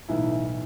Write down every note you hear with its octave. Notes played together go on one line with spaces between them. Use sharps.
B1 A2 E3 E4